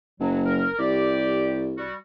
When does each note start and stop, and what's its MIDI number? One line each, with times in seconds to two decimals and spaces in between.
0.20 0.67 30
0.20 0.40 54
0.45 0.76 70
0.79 1.91 36
0.79 1.66 67
0.79 1.66 74
1.77 1.94 55
1.77 1.94 66